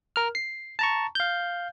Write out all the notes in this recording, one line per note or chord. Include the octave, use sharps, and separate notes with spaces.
A#4 F6
C7
A5 A#5 C#6
F5 G6